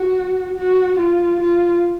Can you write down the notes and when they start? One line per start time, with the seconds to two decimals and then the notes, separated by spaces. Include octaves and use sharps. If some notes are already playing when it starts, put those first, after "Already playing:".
Already playing: F#4
0.58 F#4
0.99 F4
1.41 F4